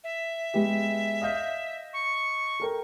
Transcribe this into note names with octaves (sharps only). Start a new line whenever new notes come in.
E5
G#3 B3 G4
D#5 F5 G6
C#6
A4 A#4 G5